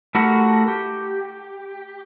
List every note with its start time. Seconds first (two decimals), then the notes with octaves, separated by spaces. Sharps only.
0.15 A3 E4 F#4 G4 A#4
0.68 G4